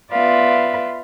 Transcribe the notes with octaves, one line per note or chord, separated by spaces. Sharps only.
B3 F4 B4 D5 E5 F5